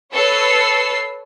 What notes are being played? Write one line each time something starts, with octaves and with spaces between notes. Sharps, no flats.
A4 B4 C#5 E6 C7